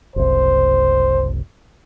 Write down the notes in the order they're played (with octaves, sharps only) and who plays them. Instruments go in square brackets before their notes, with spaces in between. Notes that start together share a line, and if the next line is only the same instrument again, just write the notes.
[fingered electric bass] F#1 C2 [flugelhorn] C5